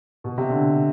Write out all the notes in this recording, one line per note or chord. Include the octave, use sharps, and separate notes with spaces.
B2
C3
D3